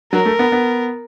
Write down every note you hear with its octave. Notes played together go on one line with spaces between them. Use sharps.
F#3 A#4
A3
B3
B3